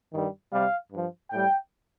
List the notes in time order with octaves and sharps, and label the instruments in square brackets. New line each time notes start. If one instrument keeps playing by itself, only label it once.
[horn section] G2 D#3 G3
C3 G3 F5
G2 F3
A2 G3 G5